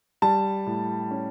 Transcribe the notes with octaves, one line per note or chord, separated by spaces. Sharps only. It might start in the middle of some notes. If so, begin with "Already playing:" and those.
G3 A5
A2
C#4